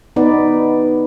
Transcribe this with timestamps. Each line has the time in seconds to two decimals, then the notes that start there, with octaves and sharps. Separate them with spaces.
0.16 B3 D#4 B4 D5